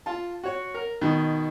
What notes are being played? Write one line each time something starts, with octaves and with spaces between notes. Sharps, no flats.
F4 A5
F#4 C#5
A#4
B2 D#3